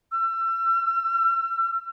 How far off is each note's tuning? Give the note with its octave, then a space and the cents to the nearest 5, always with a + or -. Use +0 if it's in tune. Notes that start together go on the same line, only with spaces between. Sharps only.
E6 +35